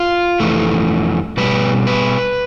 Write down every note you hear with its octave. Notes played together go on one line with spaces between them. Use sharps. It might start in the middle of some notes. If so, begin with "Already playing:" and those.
Already playing: F4
F2 E3 A3
B2 G3 B4
B4